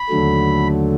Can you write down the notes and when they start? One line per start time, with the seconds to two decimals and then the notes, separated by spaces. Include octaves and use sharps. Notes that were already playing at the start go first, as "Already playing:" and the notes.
Already playing: B5
0.10 D#2 D3 F#3 A3